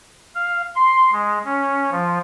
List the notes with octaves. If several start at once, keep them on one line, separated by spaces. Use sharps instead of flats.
F5
C6
G#3
C#4
F3